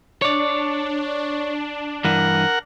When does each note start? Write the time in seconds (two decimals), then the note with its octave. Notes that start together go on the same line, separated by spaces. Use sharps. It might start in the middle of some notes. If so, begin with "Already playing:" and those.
0.22 D4 C#5 D5
2.04 G2 E3 A#4 F#5